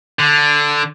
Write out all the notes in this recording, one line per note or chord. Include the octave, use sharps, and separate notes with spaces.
D3